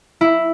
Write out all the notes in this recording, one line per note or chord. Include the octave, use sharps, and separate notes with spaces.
E4